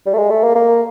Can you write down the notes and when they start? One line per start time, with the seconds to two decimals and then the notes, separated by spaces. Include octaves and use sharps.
0.06 G3
0.13 A3
0.18 G#3
0.30 A3
0.43 A#3
0.55 A#3